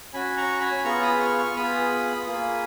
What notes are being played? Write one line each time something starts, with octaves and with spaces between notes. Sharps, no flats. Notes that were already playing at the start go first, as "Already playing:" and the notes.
C#4 F#4 G#5 B5
A#5 C#6
G#5 B5
B3 F4 G#4 A#5 C#6
B5 D#6
C#6 F6
C#6 F6
B3 F4 G#4 B5 D#6
A#3 F4 G#4